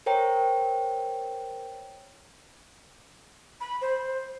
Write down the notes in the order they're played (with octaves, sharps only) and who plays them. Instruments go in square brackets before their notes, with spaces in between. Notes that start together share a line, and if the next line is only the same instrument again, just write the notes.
[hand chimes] A#4 C5 C#5 G5 A#5
[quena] B5
C5